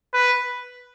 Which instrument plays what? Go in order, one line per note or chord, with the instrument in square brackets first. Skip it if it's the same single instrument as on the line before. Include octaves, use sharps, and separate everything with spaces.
[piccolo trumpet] B4